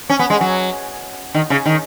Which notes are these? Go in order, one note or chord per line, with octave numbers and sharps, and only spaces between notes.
C#4
B3
G#3
F#3
D#3
C#3
D#3